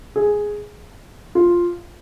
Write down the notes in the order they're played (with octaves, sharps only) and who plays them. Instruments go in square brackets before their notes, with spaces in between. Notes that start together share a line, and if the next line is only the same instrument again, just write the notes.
[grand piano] G#4
F4